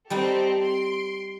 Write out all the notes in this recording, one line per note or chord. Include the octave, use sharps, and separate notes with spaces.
G3 C4 D#4 G4 A4 B4
C6 D7